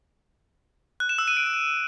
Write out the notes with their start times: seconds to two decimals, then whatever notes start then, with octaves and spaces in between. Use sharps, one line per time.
1.00 F#6
1.09 E7
1.18 E6
1.28 D#7
1.37 D7